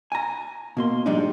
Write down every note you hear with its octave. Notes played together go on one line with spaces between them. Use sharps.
G#5 A#5
B2 A#3 C6
G#2 F3 G3 G#3 D4 D#4